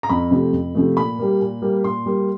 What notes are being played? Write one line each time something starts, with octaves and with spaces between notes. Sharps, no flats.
A#5
F2 B5
C3 F3 A3
F2
C3 F3 A3
A#2 B5
G3 A#3
A#2
G3 A#3
A#2 C6
G3 A#3